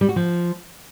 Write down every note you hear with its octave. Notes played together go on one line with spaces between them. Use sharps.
G3
F#4
F3